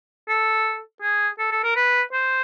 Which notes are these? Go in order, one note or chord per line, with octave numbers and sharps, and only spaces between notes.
A4
G#4
A4
A4
A#4
B4
C5